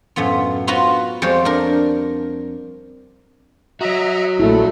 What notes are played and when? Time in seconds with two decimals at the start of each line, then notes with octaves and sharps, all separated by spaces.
0.16 F#2 A2 B3 F4
0.67 B3 F4 F#4 B4 A#5
1.22 F2 G3 G#3 C5 C#5 F5
1.45 D4 A#4
3.81 F#4 C#5 D#5 E5 A#5
4.39 A#1 A3 E4 A4